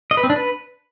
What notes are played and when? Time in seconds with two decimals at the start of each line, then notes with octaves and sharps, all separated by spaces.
0.11 D#5
0.17 B4
0.24 C4
0.30 D4
0.36 B4